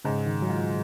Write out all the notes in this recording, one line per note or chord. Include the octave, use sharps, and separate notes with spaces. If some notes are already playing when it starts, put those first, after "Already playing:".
G#2 C#3
D#3
F#3
G#3 F4